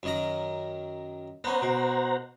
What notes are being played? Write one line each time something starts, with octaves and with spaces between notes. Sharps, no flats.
F#2 D#3 A#5
B3 C#4 C5 F#5 A#5
B2